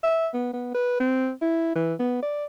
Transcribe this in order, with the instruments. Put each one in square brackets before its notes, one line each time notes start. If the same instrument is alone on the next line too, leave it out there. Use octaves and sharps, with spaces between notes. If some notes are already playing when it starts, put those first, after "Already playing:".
[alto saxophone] E5
B3
B3
B4
C4
E4
E3
B3
D5